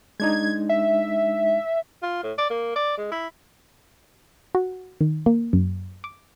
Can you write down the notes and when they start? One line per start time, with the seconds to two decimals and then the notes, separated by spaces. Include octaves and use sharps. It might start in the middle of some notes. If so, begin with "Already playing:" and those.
0.20 G#3 D4 D#4 G#6
0.69 E5
2.03 F4
2.23 A2
2.38 D5
2.50 A#3
2.76 D5
2.98 G#3
3.11 E4
4.55 F#4
5.01 D#3
5.26 A#3
5.53 F#2
6.04 D6